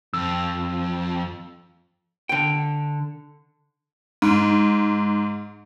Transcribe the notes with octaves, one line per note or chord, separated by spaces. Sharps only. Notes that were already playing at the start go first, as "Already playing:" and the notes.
F2 E6
D3 G5
G#2